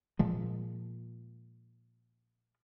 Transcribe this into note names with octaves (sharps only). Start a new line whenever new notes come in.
A#2 F3 G#3